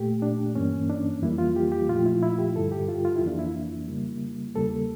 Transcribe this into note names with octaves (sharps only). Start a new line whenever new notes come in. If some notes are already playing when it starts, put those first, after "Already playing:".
Already playing: A#2 A3 G4
D4
G2 E3 A#3 C#4
D4
F2 E3 G3 A#3 E4
F4
G4
G4
A#2 F3 A3 F4
E4
E4
G4
G2 D3 G3 A4
G4
F4
F4
E4
F2 E3 A#3 D4
E4
C#3 G3 A#3
E2 C#3 G3 A#3 A4